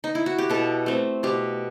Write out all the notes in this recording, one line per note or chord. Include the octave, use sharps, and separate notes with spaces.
D#4
E4
F#4
G4
B2 A4
A3 C4
B2 G4